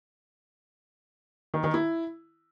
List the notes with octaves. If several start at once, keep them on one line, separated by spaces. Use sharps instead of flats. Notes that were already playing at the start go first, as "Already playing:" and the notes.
D#3
D#3
E4